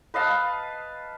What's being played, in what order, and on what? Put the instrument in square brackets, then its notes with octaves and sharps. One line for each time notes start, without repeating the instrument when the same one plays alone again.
[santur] B4 D#5 F5 A5